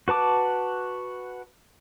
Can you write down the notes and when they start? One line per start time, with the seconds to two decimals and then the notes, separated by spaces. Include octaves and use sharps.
0.08 F#4 B4 A5 D6